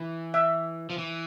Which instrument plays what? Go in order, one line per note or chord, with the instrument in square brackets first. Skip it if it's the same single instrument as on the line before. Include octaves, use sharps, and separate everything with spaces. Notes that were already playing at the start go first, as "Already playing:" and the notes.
Already playing: [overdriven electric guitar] E3
[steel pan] E5
[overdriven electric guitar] F3
E3